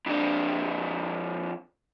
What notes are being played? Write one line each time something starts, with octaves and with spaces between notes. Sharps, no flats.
F2 D4